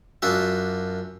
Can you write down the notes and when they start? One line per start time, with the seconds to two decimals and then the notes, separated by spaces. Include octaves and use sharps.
0.22 F#2 D4 F4 F#4 E5